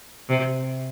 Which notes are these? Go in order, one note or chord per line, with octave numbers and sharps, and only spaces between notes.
C3